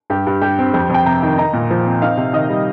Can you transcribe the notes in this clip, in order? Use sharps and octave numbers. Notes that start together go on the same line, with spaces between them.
G2 G4
G2
G3 G4
C4
F2 G4
F2 G5
C3 A#5
D#3
D#4 A#5
A#2
F3
C4
D#4 F5
C3
D#3 D#5
G3